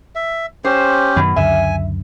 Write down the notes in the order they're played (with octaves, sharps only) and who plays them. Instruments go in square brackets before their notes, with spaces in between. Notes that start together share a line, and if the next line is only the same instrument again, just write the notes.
[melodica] E5
[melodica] C#4 G4 [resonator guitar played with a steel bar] C5
[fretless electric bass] F#2 D#3 [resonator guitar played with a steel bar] B2
[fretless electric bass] C#2 F#2 D3 [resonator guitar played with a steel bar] E5 [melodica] G#5